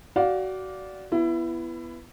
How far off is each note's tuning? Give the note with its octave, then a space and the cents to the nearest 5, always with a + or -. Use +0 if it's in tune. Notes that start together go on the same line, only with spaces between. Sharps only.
F#4 +25 D5 -15 F5 +20
B3 +0 E4 +25